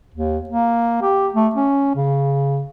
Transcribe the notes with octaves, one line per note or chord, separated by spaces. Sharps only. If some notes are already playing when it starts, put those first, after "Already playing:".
D#2
A#3
G4
A3
C#4
C#3